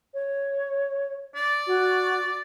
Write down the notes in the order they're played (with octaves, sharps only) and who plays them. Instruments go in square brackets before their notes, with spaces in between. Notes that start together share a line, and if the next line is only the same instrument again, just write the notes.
[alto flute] C#5
[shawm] D5
[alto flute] F#4